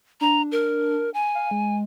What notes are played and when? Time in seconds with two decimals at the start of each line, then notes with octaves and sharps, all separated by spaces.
0.21 D4 A#5
0.52 A#4
1.14 G#5
1.35 F5
1.51 G#3